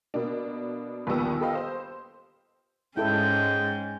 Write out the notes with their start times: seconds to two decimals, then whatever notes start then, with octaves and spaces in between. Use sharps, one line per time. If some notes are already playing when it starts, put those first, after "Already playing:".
0.14 B2 A#3 D4
1.07 A#1 D#2 G3 B3 E6
1.40 G4 A4 B4 D#5 F5
1.55 C5 C6
2.97 G#2 G#3 C#4 E4 A4 G5